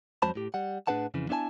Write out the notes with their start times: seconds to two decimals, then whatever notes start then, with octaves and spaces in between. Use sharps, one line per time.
0.22 F2 F#3 G#3 C5 A5 B5
0.35 A2 G4
0.54 G3 F#5
0.87 A2 D4 G#4 B4 F#5 A5
1.14 F2 C#3 E3
1.29 B3 D4 E4 C5 G#5 A5